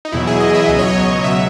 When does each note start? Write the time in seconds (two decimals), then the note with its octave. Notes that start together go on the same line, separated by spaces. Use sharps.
0.05 D#4
0.12 E2 B2 F#3 E4
0.27 G#4
0.40 D#5
0.54 E5
0.68 C#2 B2 F#3 D#5
0.79 C#5
0.88 D#5
1.23 C#2 B2 F#3 E5